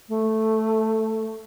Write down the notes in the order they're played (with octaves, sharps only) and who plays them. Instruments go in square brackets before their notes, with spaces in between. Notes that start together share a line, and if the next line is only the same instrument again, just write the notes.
[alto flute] A3